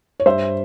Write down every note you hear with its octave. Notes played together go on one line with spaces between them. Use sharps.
C#5
G2 C5 E5